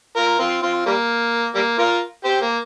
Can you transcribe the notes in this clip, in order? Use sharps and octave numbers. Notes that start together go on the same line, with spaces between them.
F4 A#4
C4 F4
C4 F4
G3 A#3
G3 A#3
F4 A#4
G4 C5
A#3